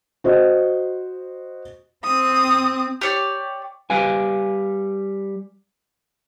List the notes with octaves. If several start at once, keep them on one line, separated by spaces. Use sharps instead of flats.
F#4 C5 D#5
C4 D#6
G4 C#5 D5
G3 B4 F5 G#5